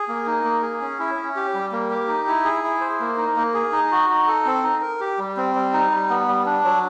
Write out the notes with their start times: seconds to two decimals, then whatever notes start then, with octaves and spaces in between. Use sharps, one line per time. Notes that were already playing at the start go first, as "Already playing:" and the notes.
Already playing: G#4
0.08 A#3
0.26 D#4
0.44 A#3
0.62 G#4
0.81 C#4
0.99 E4
1.16 C#4
1.36 G4
1.54 G3
1.72 A#3
1.90 G4
2.08 D#4
2.27 E4
2.45 G#4
2.64 E4
2.81 C5
3.00 A#3
3.17 D#4
3.36 A#3
3.54 G#4
3.72 D#4
3.91 F#4
4.10 D#4
4.27 A4
4.46 C4
4.63 D#4
4.82 A#4
5.00 G4
5.18 G3
5.37 C4
5.55 G3
5.73 D#4
5.91 G3
6.09 B3
6.28 G3
6.46 D4
6.65 F#3